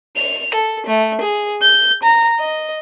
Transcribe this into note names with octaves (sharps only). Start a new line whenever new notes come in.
F7
A4
A3
G#4
G6
A#5
D#5